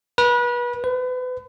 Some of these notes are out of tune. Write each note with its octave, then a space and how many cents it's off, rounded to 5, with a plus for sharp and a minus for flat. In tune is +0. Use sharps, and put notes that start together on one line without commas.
B4 -30
B4 +35